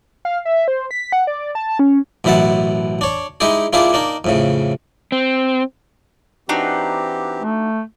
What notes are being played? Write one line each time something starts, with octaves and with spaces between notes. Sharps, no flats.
F5
E5
C5
B6
F#5
D5
A5
C#4
A1 F#2 B2 E4 F#5 A5
D4 C#5
G#3 D#4 E4 G4 G#4
A#3 D4 E4 F4 G4 G#4
A#3 D4 D#4
F2 A2 C#3
C4
E3 C4 D4 D#4 F#4 G4
A3